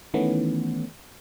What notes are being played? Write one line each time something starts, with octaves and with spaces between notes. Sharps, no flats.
D#3 E3 A3 B3 C#4